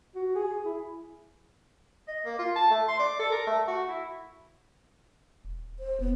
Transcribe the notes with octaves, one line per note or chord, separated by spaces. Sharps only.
F#4
G#4
E4
D#5
A#3
F4
A5
A3
C6
D5
A4
A#4
A3
F#4
E4
D#1
C5
E1 B3